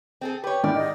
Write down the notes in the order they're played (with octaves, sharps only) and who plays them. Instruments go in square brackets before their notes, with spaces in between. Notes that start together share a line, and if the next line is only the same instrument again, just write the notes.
[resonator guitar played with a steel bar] C4 G#4 A4
[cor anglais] G4 [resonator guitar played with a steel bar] B4 C#5
[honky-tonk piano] G#2 D#3 E4 [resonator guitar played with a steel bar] D5
[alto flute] D#5